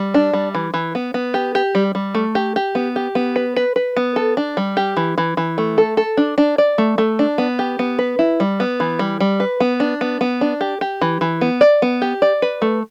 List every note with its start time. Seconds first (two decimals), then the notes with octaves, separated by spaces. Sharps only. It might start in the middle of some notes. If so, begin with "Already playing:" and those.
Already playing: G3
0.14 D4
0.33 G3
0.55 E3
0.74 E3
0.95 B3
1.14 B3
1.34 G4
1.55 G4
1.75 G3
1.95 G3
2.15 A3
2.35 G4
2.56 G4
2.75 B3
2.96 G4
3.15 B3
3.36 B4
3.56 B4
3.76 B4
3.96 B3
4.16 A4
4.37 D4
4.57 G3
4.77 G4
4.97 E3
5.18 E3
5.37 E3
5.58 A3
5.78 A4
5.97 A4
6.17 D4
6.38 D4
6.58 D5
6.78 A3
6.98 A3
7.19 D4
7.38 B3
7.59 G4
7.79 B3
7.99 B4
8.19 E4
8.40 G3
8.60 B3
8.80 E3
8.99 G3
9.20 G3
9.40 B4
9.60 B3
9.80 D4
10.01 B3
10.21 B3
10.41 D4
10.61 G4
10.81 G4
11.01 E3
11.21 E3
11.41 B3
11.61 D5
11.82 B3
12.02 G4
12.22 D5
12.42 B4
12.62 A3